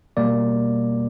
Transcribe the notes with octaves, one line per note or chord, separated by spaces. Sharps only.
B2 G3 A#3 D5